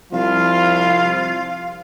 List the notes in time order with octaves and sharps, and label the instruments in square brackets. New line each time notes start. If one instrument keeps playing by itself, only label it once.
[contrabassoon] C2 [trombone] F3 [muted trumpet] F4 [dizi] F5